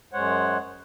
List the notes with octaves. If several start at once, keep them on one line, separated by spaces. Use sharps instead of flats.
F#2 G#3 C5 C#5 F#5